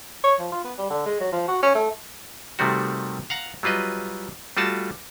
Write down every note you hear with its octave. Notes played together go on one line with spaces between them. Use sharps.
C#5
F3
F4
B3
G3
D3
G#3
F#3
F3
F#4
C#4
A3
C3 D#3 G3 A3 C4 F#4
F5 F#5 A#5
F#3 G3 F4 B4 D#5
G3 A3 F4 F#4 A5